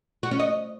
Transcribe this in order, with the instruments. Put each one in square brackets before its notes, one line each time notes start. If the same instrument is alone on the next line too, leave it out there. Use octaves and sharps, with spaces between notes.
[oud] F#4
C#4
D#5